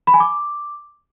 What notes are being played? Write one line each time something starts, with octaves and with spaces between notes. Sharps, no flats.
B5
G#5
D6